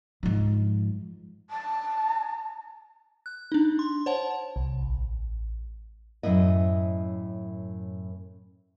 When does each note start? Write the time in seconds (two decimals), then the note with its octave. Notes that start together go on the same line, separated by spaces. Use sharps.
0.23 G#2 F3
1.50 A5
3.26 F#6
3.52 D4 D#4
3.79 C6
4.06 C5 C#5 F#5 A5
4.56 C2
4.83 A1
6.23 F#2 A2 E4 D#5